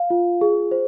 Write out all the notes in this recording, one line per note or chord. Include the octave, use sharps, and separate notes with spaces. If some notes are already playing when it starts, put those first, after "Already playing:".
Already playing: F5
F4
G#4
C5